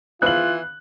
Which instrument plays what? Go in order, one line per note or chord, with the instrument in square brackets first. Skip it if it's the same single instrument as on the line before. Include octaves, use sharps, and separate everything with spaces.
[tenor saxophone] E3 [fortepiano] B3 F5 [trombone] F4 [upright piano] F#6 F#7